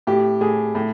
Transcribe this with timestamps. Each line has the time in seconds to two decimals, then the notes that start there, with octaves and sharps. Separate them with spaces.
0.07 A2 G4
0.41 A2 G#4
0.75 A2